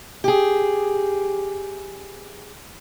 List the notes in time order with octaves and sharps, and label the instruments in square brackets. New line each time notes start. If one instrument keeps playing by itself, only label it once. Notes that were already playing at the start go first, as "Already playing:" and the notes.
[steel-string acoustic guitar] G4 G#4